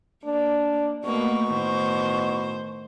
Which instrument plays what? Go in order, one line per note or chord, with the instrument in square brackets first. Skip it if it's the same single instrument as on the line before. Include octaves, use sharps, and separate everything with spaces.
[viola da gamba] A#3 [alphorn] D4
[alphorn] B2 [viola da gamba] A3 A#3 [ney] C#6
[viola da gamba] A2 D#3 C5